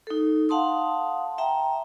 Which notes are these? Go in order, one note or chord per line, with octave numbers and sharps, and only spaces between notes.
D#4 A4
F5 F#5 A5 C6 D#6
E5 G5 A#5